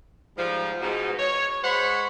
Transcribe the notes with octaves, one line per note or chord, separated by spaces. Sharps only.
G#2 F3 G3
G#2 B2 D#4
C#5
G#3 C5 C#5 F#5 B5